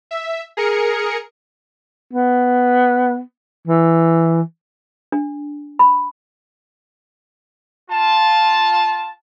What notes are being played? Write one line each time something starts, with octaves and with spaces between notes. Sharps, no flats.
E5
G#4 A#4 C#7
B3
E3
D4
B5
F4 A5